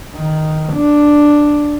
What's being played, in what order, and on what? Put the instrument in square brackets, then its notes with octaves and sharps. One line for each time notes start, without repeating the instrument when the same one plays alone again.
[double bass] D#3
D4